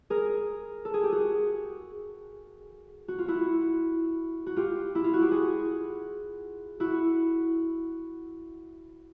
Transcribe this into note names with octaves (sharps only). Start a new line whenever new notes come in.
G#4 A#4
A4
G#4
G4
F#4 G#4
F#4
F4
E4 F#4
F#4
F4 G4
E4
F4
F#4
G4
F#4 G#4
E4 F#4